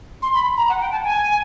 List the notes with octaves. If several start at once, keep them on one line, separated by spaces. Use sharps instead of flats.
C6
B5
A#5
F#5
G5
A5
G#5